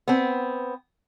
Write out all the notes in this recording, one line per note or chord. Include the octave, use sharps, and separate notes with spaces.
B3 C4